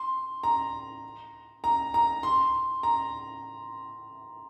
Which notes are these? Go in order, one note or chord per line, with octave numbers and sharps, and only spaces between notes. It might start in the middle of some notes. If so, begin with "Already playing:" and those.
Already playing: C6
A#5
A#5
A#5
C6
A#5